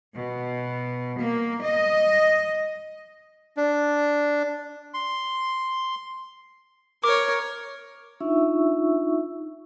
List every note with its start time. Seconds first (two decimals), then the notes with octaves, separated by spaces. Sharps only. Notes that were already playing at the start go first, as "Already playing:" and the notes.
0.15 B2
1.20 A#3
1.63 D#5
3.57 D4
4.94 C6
7.04 A#4 C#5 D6
8.21 D4 D#4 F4 E5 C#6 E6